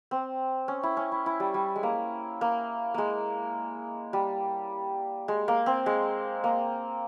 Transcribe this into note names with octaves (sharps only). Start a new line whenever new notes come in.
C4
C#4
E4
C#4
E4
E4
G3
G3
G#3
A#3
A#3
G#3 A#3
G3
G#3
A#3
C4
G#3
A#3